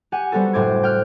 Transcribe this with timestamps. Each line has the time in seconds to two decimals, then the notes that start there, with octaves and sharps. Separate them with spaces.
0.12 G4 F#5 G#5
0.32 G3 B3 C4 F#4 A4
0.53 F#1 A2 C5 D6 G#6
0.83 G5 F6 F#6